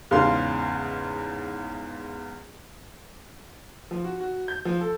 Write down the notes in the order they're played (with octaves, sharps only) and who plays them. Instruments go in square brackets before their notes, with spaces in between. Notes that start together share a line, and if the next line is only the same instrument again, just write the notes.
[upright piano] E2 G#2 C#3 F5 C6
[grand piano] F3
F#4
F#4
G6
F3
A4